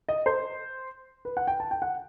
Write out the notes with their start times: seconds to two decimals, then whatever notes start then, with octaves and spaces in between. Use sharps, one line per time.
0.09 D#5
0.26 C5
1.25 B4
1.37 F#5
1.47 G5
1.60 A5
1.71 G5
1.82 F#5